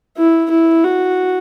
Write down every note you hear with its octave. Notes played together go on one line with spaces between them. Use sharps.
E4
E4
F#4